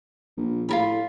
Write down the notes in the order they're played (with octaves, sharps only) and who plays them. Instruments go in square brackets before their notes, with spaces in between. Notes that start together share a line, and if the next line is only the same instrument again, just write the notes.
[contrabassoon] A#1
[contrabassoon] A2 [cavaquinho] F4 A#4 B5